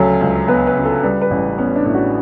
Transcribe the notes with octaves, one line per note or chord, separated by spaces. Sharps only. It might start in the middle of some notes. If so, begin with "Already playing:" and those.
Already playing: D2 C#3 F#3 A4
C#2
B3 B4
B4
C#3
A4
G3 B4
B4
A1
B3 C#4
D4
A2
F#4